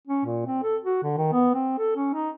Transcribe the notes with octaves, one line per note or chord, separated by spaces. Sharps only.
C#4
A#2
C4
A4
F#4
D3
D#3
B3
C4
A4
C#4
D#4